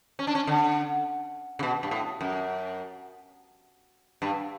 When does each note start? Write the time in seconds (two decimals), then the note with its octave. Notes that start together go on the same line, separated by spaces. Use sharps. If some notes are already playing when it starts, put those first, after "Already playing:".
0.19 C#4
0.27 D4
0.35 C#4
0.47 D3
1.59 C#3
1.63 B2
1.83 G2
1.91 A2
2.21 F#2
4.22 G2